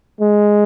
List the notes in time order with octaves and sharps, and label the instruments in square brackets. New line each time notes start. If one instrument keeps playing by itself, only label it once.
[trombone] G#3